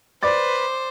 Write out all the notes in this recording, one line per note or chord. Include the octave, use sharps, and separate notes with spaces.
B4 C5 D5 D6 A6